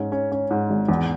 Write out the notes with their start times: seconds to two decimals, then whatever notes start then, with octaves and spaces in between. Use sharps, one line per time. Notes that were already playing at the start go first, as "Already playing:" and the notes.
Already playing: G#2 C#4
0.12 C#4
0.32 C#4
0.51 G#2
0.70 G#1
0.89 E2